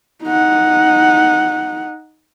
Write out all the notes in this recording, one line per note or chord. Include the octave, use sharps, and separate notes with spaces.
D#4 F#5